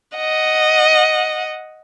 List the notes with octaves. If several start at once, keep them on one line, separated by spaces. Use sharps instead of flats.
D#5 F#5